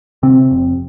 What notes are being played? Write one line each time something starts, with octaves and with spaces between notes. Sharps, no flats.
C3 C4
F1